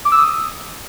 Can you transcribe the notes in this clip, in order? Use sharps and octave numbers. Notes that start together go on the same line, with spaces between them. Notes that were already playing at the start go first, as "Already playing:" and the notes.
D6
E6
D#6